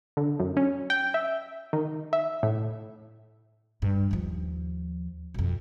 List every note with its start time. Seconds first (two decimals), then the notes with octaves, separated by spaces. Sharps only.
0.17 D3
0.39 F#2
0.57 C#4
0.90 G5
1.14 E5
1.73 D#3
2.13 E5
2.43 A2
3.82 G2
4.11 D#2 F3
5.34 B1 F2